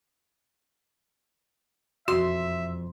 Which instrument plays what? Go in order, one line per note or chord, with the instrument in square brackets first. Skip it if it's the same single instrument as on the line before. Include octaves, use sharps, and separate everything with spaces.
[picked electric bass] E1 F2 [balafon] F#4 [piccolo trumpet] E5 [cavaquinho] C6